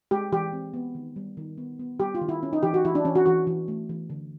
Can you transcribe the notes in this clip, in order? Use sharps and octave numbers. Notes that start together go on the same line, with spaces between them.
G#3 G4
E3 G4
C4
B3
D#3
G3
D#3
B3
B3
G3 G4
F4
D#3
E4
C#4
D#4
E3 G4
F#4
E3 E4
D4
E3 C#4
F#4
E3 F#4
E3
A3
E3
D3